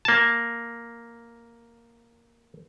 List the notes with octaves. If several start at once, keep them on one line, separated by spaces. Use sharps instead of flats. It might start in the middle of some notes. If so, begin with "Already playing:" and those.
A#3 A5